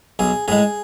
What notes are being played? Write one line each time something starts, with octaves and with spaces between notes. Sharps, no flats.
B1 G#4
A2 G#3 G#4